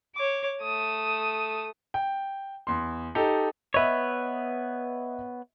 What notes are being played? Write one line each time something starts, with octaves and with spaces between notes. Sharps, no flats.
C#5 D6
A3 D#6
G5
E2 C6
D#4 G4 A4
B3 B4 C#5 D#5 E5